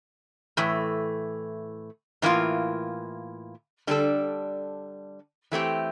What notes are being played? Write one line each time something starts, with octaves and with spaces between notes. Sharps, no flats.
A2 E3 A3
A2 E3 A#3 F4
D3 G3 D4 A4
E3 A3 C4 G4